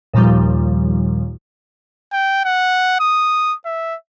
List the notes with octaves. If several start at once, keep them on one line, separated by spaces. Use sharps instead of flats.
D#2 A#2 D#3 F3 G3
G5
F#5
D#6
E5